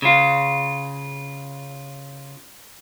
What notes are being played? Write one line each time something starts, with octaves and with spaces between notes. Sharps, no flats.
C#3 F4